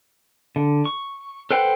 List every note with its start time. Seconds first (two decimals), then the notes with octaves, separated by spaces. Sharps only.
0.56 D3
0.85 C#6
1.51 A4 B4 C5 F#5 G5